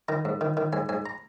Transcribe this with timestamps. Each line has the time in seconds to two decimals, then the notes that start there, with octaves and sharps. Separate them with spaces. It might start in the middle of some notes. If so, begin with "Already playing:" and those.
0.08 D#3 A#5
0.25 G#2
0.41 D#3
0.57 D#3
0.73 G#2 G#5
0.89 G#2 G#5
1.06 A#5